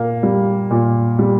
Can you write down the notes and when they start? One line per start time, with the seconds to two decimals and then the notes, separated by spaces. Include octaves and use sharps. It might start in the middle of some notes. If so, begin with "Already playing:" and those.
Already playing: A#2 A#3
0.23 G3
0.71 A#2
1.19 G3